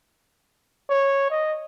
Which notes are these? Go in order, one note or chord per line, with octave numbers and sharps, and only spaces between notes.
C#5
D#5